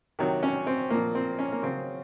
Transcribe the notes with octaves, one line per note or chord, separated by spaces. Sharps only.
C3 D#3 F#3
C#4
C4
A#2 F3 A#3
C4
C#4
A#3
C#3 F#3 C4